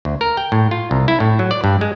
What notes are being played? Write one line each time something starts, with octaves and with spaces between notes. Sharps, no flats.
D2
A#4
G5
A2
F4
C2
E4
A2
F#3
D5
G2
G#3